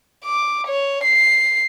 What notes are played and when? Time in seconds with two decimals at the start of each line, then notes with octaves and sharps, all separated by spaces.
0.24 D6
0.67 C#5
1.04 C7